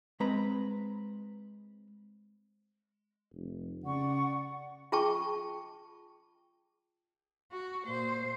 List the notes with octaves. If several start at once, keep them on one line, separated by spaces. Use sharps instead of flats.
G#3 C4 B4 A#5 B5
F1
C#3 D5 F#5 C#6
F4 G#4 G5 A5 C#6
F#4
A#2 C5